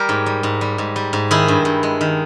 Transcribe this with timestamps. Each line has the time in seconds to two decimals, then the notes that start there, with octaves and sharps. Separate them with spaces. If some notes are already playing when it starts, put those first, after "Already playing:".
Already playing: G3 G4 A#4
0.09 G#2
0.26 G3
0.43 G#2
0.61 G3
0.78 G#2
0.96 G3
1.13 G#2
1.31 D#3 E4 G#4
1.48 G2
1.65 G2
1.83 G#3
2.01 D#3